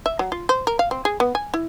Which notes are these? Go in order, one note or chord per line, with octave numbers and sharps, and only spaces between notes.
E5
F#3
F4
C5
A#4
F5
C4
G#4
B3
G#5
E4